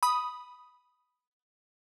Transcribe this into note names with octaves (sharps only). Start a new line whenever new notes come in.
B5 D#6